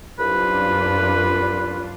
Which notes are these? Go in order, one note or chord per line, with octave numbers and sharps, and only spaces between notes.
C2 F#2 D4 F4 B4